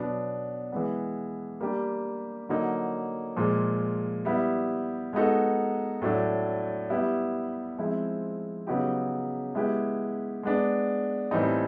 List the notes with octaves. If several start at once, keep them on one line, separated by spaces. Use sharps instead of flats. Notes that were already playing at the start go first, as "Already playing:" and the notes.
Already playing: B2 F#3 B3 D4
E3 G#3 B3
G3 A#3 D4 G4
D3 F#3 A#3 D#4
A#2 F3 G#3
G3 B3 E4
G#3 B3 D#4 F#4 A4
A2 F#3 A3 D4
G3 B3 E4 G4
F3 G#3 C4 E4
C#3 F#3 B3 D#4 G4
G#3 B3 E4 G4
G#3 B3 D4
A2 E3 G3 C4 D#4